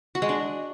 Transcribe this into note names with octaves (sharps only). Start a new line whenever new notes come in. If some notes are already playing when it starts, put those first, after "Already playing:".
F#4
G#3
D4